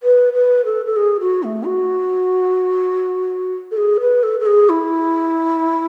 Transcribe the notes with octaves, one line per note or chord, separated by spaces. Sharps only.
B4
B4
A4
A4
G#4
F#4
A3
F#4
A4
G#4
B4
A4
A4
G#4
E4